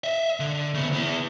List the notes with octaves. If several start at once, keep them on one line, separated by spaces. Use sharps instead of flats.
D#5 E5
D3
C#3 B3
B3 E4